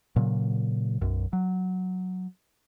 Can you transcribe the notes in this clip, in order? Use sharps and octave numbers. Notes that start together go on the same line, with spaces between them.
A#2 C#3 F#3
B1 F#2
F#3